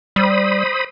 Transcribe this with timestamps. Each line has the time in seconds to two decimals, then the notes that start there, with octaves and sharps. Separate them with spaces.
0.16 G3 C5 B5 D#6